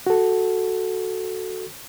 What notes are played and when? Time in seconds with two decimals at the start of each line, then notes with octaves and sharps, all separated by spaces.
0.07 F#4 A4